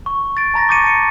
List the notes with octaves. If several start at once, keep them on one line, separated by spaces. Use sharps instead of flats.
C#6
A6 D7
A5 A#5 A6 A#6
C#6 D6 G6 A6 C#7 D#7
A5 C#7